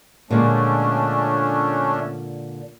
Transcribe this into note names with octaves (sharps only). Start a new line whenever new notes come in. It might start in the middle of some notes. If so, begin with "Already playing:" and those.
A#2 D3 G#3 A3 C#4 D4